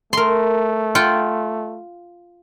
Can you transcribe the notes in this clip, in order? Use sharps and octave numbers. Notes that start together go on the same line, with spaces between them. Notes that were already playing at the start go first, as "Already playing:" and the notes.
A3 A#4 C6
F4 F#5 G5